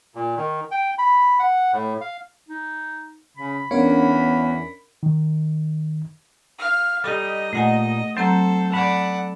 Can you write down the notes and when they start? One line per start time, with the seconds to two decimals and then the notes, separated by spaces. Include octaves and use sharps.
0.15 A#2
0.37 D#3
0.71 G5
0.98 B5
1.39 F#5
1.72 A2
2.01 F5
2.48 D#4
3.37 C#3 B5
3.71 E2 B3 C#4 D4 A#4 C#5 F5
5.03 D#3
6.59 F5 F6
7.04 G3 D#4 G4 A4 D#5
7.53 A#2 A3 D#4 F#5 G#5
8.17 F#3 C4 A4 C5 A#5
8.72 A4 D5 F#5 B5